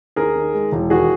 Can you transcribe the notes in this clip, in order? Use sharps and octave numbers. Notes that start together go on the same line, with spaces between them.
D#2 G#4 A#4
D#3
G#3
E1
D#2 F#4 G#4